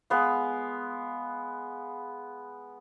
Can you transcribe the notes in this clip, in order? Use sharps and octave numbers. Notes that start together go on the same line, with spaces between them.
G#3 B3 F5